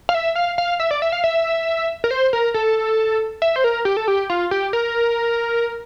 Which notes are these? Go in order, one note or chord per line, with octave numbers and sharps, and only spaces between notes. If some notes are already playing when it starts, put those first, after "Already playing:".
F5
E5
F5
F5
E5
D5
E5
F5
E5
A#4
C5
A#4
A4
E5
C5
A#4
G4
A4
G4
F4
G4
A#4